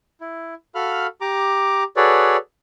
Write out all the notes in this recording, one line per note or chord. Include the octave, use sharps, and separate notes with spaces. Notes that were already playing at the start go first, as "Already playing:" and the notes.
E4
F#4 A4 F5 B5 F6
G4 A#5 D6
F#4 G#4 A4 B4 C#5 D5